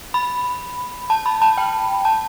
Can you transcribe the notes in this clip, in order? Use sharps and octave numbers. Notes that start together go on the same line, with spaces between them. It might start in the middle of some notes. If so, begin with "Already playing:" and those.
B5
A5
B5
A5
G5
A5